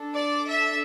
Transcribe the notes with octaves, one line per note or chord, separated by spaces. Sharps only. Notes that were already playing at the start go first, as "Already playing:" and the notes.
Already playing: D4 A4
D5
E5